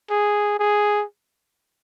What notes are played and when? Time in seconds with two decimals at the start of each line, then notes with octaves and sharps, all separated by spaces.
0.11 G#4
0.60 G#4